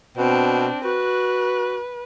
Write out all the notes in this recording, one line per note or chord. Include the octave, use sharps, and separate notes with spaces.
B2 C4 D4
F#4 B4